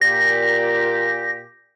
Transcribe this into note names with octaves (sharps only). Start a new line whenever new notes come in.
A#2 G4 A#6